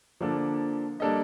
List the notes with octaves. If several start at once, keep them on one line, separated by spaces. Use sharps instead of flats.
D3 F3 A#3 D4 A4
G3 A#3 D4 A4 D#5